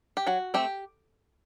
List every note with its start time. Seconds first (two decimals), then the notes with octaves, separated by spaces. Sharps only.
0.17 G4
0.27 F#3 F#4
0.54 A3 C4 G4